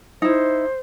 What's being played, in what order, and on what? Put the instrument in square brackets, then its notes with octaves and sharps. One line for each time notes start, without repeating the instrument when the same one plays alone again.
[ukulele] D#4 E4 [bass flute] C5